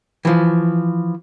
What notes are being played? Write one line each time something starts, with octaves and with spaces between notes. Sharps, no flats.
E3 F3